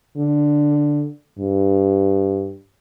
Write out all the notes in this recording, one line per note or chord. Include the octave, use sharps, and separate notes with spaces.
D3
G2